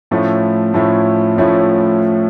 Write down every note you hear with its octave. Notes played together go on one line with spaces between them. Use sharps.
A2 F3 A3 C#4 E4
A2 F3 A3 C#4 E4
A2 F3 A3 C#4 E4